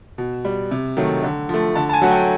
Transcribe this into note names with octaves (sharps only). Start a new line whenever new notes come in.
B2
G3
C3
D#3 F#3 A3
D3
F3 A3
D3 A5
A5
G#5
F#3 A3 F#5
G5